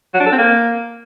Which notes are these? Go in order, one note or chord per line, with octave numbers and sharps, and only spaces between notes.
F#3
D4
A4
C4
A#3